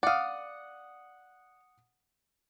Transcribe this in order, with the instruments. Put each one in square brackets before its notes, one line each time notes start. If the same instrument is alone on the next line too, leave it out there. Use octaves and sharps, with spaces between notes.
[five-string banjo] D5 F5 [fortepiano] F#5 D#6